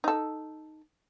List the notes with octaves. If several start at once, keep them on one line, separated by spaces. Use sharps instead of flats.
D#4 A4